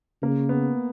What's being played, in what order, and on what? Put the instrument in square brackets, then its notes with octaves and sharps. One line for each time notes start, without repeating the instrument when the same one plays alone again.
[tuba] C#3 [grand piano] A#3
[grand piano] B3